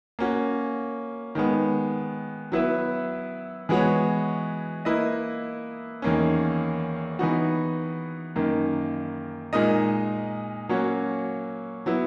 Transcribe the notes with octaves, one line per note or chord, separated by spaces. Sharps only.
A#3 C#4 F#4
D#3 G#3 B3
F#3 B3 E4 B4 E5
E3 G#3 B3 F#4 C#5
A#3 E4 B4 D#5
E2 D#3 A#3 C#4
E3 B3 D#4 F#4
F#2 D#3 A#3
A#2 G#3 D#4 A#4 D#5
F#3 A#3 C#4 F#4 C#5
F#3 B3 E4